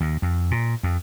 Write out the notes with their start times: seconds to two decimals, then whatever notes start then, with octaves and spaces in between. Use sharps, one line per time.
0.01 D#2
0.22 F2
0.51 A#2
0.83 F2